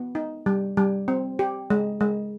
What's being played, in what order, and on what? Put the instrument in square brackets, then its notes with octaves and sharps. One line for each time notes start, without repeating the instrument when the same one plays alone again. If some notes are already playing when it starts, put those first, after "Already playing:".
Already playing: [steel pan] B3
D#4
G3
G3
C4
G4
G#3
G#3